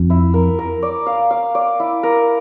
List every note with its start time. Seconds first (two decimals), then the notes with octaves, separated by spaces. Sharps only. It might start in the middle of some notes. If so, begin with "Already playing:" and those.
Already playing: F2
0.10 E4
0.34 A#4
0.59 A#4
0.83 D5
1.06 F5
1.31 F5
1.55 D5
1.80 E4
2.03 A#4